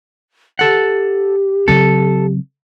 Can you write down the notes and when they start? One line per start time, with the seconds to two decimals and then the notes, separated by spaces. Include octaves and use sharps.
0.59 G4 A4 F#5
1.68 C#3 F#3 C4 A4